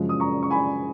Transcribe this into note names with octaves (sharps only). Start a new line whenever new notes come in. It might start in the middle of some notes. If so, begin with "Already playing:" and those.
Already playing: F#2 C#3 F3 G#3
D#6
A#5 C#6
C#6
G#5 B5